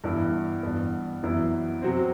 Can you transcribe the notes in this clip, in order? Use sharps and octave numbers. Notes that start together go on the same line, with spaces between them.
G2 E3 B3 E4
G2 E3 B3
F#2 E3 B3 E4
C3 F#3 C4